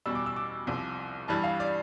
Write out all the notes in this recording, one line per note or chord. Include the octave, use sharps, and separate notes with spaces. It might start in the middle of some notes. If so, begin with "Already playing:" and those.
E2 B2 G3 E6
D6
E6
D6
C2 C3 F3
G2 E3 G3 A5
F5
D5